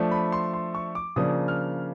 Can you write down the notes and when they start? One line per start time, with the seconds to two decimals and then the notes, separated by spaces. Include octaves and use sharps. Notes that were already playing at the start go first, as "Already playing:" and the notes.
Already playing: F3 A3 D4
0.11 B5
0.32 C6
0.54 C6
0.75 C#6
0.95 D6
1.16 C#3 F3 A#3 D4 D#6
1.48 F6